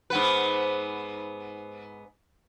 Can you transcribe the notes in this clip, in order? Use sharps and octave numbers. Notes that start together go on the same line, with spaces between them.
G#2 B3 B4